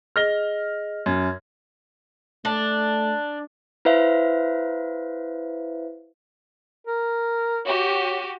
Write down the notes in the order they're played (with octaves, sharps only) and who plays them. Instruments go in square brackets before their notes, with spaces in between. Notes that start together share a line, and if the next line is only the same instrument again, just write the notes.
[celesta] G#4 D#5 [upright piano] F6 A#6 G7
[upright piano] F#2 [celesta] G#6
[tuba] A3 [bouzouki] D4
[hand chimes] E4 B4 C5 E5 F5
[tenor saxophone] A#4
[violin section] F#4 G4 [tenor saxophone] C#5